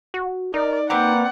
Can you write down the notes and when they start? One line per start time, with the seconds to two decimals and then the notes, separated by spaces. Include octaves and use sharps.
0.14 F#4
0.54 D#4 A#4 D5
0.90 A#3 C4 B4 D5 F#5 A#5